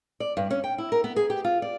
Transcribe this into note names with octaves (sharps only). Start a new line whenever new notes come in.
D5
G2
C#4
G5
E4
A#4
B3
G#4
G4
F4
D5